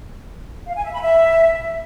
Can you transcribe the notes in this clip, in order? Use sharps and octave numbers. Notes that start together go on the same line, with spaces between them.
F5
G#5
E5
B5
E5